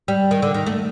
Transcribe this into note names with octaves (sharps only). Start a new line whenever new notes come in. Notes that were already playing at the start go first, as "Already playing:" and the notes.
G3
D#3
D3
D#3
A3